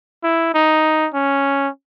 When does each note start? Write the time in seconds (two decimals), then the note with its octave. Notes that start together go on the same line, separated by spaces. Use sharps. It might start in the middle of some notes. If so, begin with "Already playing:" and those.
0.23 E4
0.54 D#4
1.14 C#4